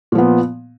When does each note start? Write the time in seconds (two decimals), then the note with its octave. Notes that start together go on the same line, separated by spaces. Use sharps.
0.12 A#2
0.15 F3
0.18 B3